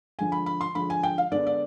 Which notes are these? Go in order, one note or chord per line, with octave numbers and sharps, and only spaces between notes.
D3 F3 G#3 G#5
B5
B5
C6
D3 F3 G#3 B5
G#5
G5
F5
D3 G#3 B3 D4 D5
D5